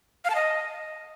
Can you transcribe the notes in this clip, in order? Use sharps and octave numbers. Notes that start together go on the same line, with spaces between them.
F5
A5
D#5